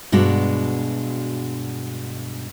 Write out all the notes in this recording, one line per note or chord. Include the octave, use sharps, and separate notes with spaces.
G2 B2 G#3 D4 F#4 D5